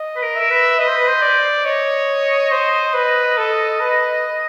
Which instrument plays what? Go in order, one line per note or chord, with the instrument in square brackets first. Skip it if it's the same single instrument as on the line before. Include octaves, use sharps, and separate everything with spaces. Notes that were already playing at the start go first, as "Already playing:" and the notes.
Already playing: [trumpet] D#5
[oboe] B4
A#4
[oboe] A#4 [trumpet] E5
[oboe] B4
[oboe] B4 [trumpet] D#5
[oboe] C5
B4
C5
[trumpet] D5
[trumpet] C#5 [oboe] D#5
[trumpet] C5
B4
A4
B4